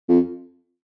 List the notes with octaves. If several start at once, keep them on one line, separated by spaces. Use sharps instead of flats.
F2